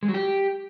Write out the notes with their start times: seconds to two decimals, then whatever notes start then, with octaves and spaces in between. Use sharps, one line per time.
0.03 G#3
0.08 F#3
0.14 G4